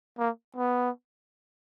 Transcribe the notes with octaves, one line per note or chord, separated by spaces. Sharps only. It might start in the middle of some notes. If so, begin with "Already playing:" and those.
A#3
B3